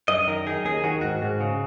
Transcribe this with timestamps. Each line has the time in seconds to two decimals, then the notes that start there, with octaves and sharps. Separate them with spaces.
0.08 F#2 D#5
0.27 D#3 A#4
0.47 D#4 G#4
0.65 D#2 G#4
0.84 D#3 F#4
1.01 G#2 F#4
1.22 G#2
1.41 C#3